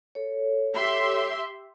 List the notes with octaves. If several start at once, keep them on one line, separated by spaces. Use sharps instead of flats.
A4 C#5
G4 E5 C6